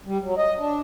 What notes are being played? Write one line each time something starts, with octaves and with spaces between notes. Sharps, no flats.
G3
F#3
D#5
D4